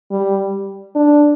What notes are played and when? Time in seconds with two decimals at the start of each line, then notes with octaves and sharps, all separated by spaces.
0.11 G3
0.95 D4